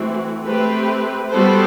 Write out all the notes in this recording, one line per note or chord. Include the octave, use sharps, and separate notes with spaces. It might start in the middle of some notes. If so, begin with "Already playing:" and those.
Already playing: E3 A3 C4 F#4
A3 C4 G4 B4
G3 B3 F#4 A4 C5